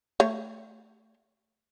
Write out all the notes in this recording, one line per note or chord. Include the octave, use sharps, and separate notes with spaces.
A3 C#5